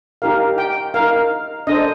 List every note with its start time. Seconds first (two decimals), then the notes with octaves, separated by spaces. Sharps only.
0.22 D#4 G4 A#4 F5
0.58 G5
0.94 A#4 F5
0.99 D#4
1.67 D4 A4 C5 D#5